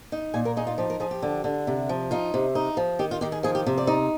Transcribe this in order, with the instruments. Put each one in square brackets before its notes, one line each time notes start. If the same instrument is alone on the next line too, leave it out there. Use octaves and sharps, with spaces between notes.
[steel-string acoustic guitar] D#4
A#2 G#5
A#4
D#4 G#4
F4
F3 G4
A#4
F3 G#4
G4
D3
D3
C3
F3
D#4 F4
C3
D#4
F3
D#3 G4
F4
D#3 G4
G#4
F3 G#4
G4
C3
D5
D#4